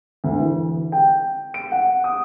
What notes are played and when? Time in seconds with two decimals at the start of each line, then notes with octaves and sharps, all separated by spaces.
0.24 D2
0.40 E3
0.92 G5
1.54 D7
1.72 F#5
2.04 D#6